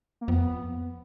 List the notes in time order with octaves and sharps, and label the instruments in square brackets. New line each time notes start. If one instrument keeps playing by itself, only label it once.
[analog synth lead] A#3
[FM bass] F2 [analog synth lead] B3